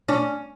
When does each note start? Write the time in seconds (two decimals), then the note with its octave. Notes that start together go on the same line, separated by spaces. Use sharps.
0.08 C#4 D4